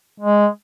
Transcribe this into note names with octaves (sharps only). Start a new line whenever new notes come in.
G#3